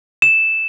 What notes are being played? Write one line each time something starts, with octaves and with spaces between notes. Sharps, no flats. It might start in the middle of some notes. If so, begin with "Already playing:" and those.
E7